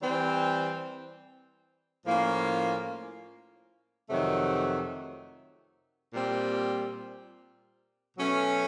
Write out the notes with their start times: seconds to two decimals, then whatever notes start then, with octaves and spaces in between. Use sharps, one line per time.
0.01 E3 G3 C4
2.05 A2 F3 A#3 C#4 F4
4.09 F2 C3 D#3 F#3 A3
6.13 A#2 G3 C4
8.17 B2 F#3 A3 C#4